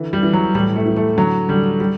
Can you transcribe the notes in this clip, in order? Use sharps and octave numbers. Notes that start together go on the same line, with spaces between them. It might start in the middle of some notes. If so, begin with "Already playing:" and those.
Already playing: D3 E3
G3
E3
F#3
A2 G3
A3
E3
A3
D3 F#3
D3 G3
G3